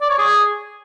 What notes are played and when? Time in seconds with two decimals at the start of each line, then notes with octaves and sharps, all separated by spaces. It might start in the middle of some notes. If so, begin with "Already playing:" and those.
0.01 D5
0.10 C#5
0.18 G#4